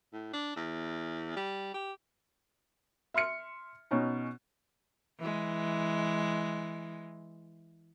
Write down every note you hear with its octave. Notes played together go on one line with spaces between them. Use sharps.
A2
D4
E2
G3
G4
E5 C6 F6 C#7
B2 C#4 D#4
E3 G#3